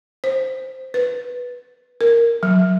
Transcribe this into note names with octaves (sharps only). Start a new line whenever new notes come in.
C5
B4
A#4
F#3